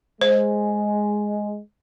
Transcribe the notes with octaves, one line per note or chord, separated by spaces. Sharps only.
G#3 C5